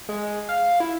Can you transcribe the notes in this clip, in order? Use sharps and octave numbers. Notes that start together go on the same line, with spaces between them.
G#3
F5
E4